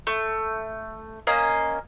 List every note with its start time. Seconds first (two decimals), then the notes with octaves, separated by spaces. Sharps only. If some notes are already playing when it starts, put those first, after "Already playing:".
0.07 A3
1.27 A#3 C#4 D#5 F5